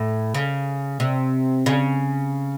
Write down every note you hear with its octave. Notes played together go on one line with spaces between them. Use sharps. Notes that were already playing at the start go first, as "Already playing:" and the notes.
Already playing: A2
C#3
C3
C#3